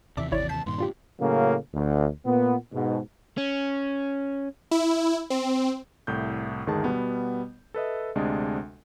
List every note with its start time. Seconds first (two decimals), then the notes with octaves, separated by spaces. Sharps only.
0.17 D#2 C3 E3 D5 E5 A5 D6
0.31 G#1 E4 C#5 D5
0.49 A5 G6 B6 C7
0.66 G2 A#2 D#3 C6
0.78 D4 F4 G4
1.20 A2 C#3 F#3 A#3 C#4
1.74 D2
2.25 A#2 B3
2.73 G#2 B2
3.38 C#4
4.71 E4
5.30 C4
6.07 C2 A2 G6
6.67 G1 D2 D#3 G#3 G#4 A5
6.84 B2 G3 B3
7.74 A4 B4 D#5 E5
8.15 D2 C3 G#3 D4 D#5